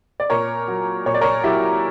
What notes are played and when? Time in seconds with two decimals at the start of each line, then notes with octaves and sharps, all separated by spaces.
0.20 D5
0.30 A#2 A#4 C#5
0.68 F#3
1.06 A#2 C#5
1.14 D5
1.21 A#4 C#5
1.43 F#3 E4 G4